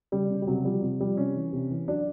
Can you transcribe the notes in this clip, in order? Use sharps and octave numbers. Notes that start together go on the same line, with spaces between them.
C#3 G3
C#3
G3
C3 F#3
F3 G3
C3
F3 G3
C3 C#4
E3
C3
E3
F#3 D4